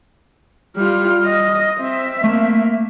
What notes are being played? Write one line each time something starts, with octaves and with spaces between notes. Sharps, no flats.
G3 F4 F6
D#5
C4 E5
A3 A#3